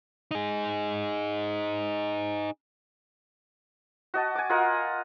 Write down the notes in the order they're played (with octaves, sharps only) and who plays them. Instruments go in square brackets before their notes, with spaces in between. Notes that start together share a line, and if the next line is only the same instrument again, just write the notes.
[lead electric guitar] D#4 G#4
[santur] F#4 D#5 A5
G#5 D6
F4 A#4 D#5 F#5